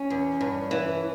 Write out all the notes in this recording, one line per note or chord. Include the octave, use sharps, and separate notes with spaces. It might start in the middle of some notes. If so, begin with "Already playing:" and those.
Already playing: C#4
E2
G2
E3